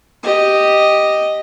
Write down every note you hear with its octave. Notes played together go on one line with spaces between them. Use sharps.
G4 D#5